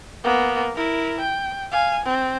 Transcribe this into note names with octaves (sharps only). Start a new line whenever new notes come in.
A#3 B3
E4 A#4
G5
F5 G#5
C4